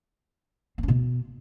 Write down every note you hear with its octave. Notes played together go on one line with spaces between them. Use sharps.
C4
C#4
B2